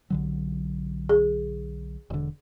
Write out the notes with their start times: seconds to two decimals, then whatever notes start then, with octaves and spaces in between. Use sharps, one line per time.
0.10 B1 D3 F#3
1.09 G#4
2.10 E1 D3